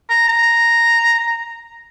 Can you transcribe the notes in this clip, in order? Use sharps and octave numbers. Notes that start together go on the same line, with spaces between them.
A#5
A#5